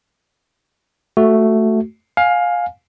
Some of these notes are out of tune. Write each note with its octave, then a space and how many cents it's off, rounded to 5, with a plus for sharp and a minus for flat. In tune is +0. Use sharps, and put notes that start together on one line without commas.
A3 +0 F#4 +0
F5 +20 G#5 +0